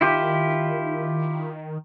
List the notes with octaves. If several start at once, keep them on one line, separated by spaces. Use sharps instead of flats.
D#3 E4 F4 G4